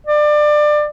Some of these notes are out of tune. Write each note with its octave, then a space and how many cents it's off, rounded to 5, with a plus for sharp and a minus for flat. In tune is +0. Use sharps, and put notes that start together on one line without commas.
D5 +25